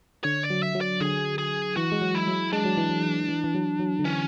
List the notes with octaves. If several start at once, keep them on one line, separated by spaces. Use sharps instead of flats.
D3 C#5
D5
F#3
E5
F#3
D5
D3 G#4
G#4
E3 F#4
G#3
F#3
E4
F#3
G#3 D4
F#3
E3
F#3
E3
E3
F#3
F#3
D3
E3 C#4